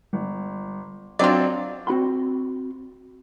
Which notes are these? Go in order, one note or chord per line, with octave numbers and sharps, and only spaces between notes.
G1
F#3 C4 D4 F4 D5 D#5
C4 F#4 B5 C6